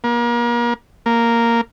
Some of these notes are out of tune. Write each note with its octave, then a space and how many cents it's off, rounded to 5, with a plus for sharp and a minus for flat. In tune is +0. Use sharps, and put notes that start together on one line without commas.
A#3 +35
A#3 -5